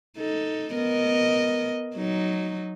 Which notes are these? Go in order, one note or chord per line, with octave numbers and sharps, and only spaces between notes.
D#4 A4
B3 A#4 D#5
F#3 D#4